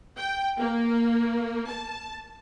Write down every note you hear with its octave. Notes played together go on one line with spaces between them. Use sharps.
G5
A#3
A5